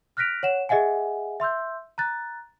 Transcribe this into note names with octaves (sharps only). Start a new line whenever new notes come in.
F6 F#6 A#6 B6 D7 F7
C#5 F#5 E7
G#4 D#5 E5 F#5 G#5
E5 C6 E6 G6
A#5 F#6 A6